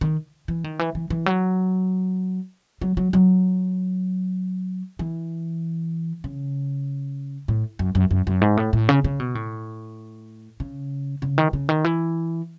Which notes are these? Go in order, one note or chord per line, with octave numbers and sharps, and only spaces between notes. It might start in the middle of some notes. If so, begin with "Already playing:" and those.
D#3
E3
D#3
E3
E3
E3
F#3
F#3
F#3
F#3
E3
C#3
A2
F#2
F#2
F#2
F#2
G#2
A2
A2
C#3
C#3
B2
A2
C#3
C#3
D#3
C#3
D#3
E3